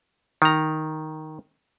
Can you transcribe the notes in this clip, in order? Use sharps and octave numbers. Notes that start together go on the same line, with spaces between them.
D#3 A#5